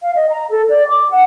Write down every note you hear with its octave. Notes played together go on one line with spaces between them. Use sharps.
F5
D#5
A#5
A4
D5
D6
F#5